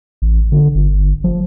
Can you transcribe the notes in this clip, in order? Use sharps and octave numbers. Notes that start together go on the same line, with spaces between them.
A1
D3
G1
F3